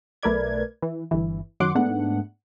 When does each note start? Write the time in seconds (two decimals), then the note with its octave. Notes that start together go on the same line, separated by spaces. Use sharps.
0.23 B1 A3 A#4 B4 D5 G#6
0.82 E3
1.11 G1 E3
1.60 F#2 D#3 F#3 F#5 C6 D6
1.75 G#2 A3 B3 D4 F#5